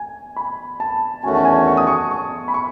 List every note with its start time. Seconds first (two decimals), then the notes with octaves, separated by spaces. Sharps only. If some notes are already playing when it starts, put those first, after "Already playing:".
Already playing: G#5
0.37 B5
0.80 A5
1.24 E2 D#3 A3 C#4 F#4 G#5
1.35 A5
1.45 G#5
1.67 C#6
1.77 D#6
1.87 C#6
2.11 C#6
2.48 B5
2.54 C#6